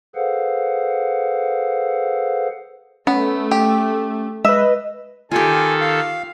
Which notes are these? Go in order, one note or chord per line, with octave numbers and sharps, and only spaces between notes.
G#4 A4 B4 C5 F5 F#5
A3 B3 C#4
G4
G#3 B4 D#5 E5
D#3 F4 G4 A4 G#5
F5